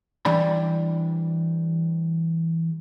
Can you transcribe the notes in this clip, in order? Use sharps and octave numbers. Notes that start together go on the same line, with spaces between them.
E3 G3 D4 B5